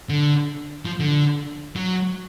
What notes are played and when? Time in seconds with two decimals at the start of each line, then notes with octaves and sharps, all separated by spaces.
0.09 D3
0.85 F3
1.00 D3
1.76 F#3